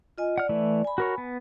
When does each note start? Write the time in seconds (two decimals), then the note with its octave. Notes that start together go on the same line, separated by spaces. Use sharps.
0.18 F4 D#5 G#5
0.38 D5 F#5 F6
0.49 E3 A3 E4
0.84 G#5 B5
0.98 F#4 A#4 C#5
1.18 B3